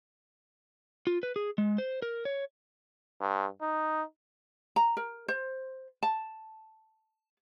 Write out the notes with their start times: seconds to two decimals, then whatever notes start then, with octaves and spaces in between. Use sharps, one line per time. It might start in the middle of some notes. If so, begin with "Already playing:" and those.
1.07 F4
1.23 B4
1.36 G#4
1.58 G#3
1.78 C5
2.02 A#4
2.25 C#5
3.21 G2
3.62 D#4
4.76 A#5
4.97 A#4
5.28 C5
6.03 A5